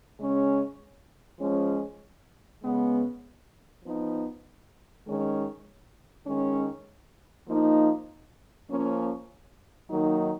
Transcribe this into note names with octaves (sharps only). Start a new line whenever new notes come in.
C#3 G#3 C#4
F3 G#3 C#4
C#3 G#3 B3
F3 B3 D#4
D#3 G#3 C#4
D#3 G#3 C#4
F3 A#3 D#4
F3 A#3 C#4
D#3 F#3 A#3 D#4